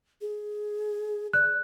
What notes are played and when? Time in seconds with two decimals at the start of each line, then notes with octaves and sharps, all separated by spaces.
0.21 G#4
1.33 D5 F#6